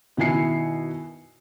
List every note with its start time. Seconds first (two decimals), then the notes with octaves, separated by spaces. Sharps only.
0.17 B2 D#3 E4 G#5 C7 C#7